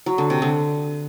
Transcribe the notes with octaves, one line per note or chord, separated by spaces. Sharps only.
F#3
D3
C3
D3